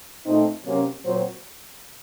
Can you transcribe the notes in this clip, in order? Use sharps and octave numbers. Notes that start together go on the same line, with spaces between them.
A#2 A3 C4 D#4
C3 F#3 A#3 C#4
A#2 F#3 C4 C5